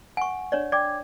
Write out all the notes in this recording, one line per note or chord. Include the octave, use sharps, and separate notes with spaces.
F#5 G#5 C#6
D4 C#5 D5
D5 G5 D6 G#6